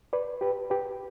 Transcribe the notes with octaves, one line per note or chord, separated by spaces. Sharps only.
B4 D5
G4 B4
G4 B4